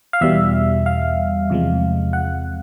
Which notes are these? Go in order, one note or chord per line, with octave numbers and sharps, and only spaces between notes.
F5
E2 B2 G3 E5
F5
E2 C3 F3 G#3
F#5